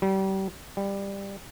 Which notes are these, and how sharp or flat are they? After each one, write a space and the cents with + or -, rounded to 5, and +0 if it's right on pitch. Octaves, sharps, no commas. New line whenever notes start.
G3 -30
G3 +15